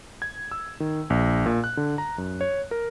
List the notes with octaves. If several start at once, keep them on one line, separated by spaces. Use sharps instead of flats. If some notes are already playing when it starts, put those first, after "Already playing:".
G#6
E6
D#3
A#1
A#2
F#6
D3
A#5
F#2
C#5
A#4